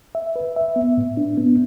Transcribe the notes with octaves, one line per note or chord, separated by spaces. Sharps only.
E5
B4
E5
B3
A2
D4
B3